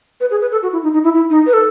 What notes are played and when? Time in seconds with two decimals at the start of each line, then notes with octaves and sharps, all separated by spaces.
0.21 B4
0.31 G#4
0.41 B4
0.52 A4
0.63 F#4
0.73 E4
0.83 D#4
0.94 D#4
1.04 E4
1.14 E4
1.30 D#4
1.46 B4
1.53 A4